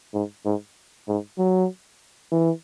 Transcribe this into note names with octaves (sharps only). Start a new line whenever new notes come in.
G#2
G#2
G#2
F#3
E3